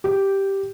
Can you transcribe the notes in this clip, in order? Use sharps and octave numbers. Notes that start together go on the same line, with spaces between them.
G4